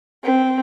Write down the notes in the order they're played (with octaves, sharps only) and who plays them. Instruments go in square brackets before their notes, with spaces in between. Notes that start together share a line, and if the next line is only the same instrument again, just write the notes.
[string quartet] C4